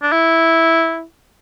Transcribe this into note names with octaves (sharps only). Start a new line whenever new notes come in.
D4
E4